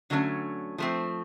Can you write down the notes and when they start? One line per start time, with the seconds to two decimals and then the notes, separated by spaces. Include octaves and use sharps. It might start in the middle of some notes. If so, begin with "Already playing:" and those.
0.10 D3 F#3 A3 C#4
0.78 F3 A3 C4